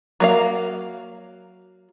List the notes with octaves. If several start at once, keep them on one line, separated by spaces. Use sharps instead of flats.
F#3 A#3 F5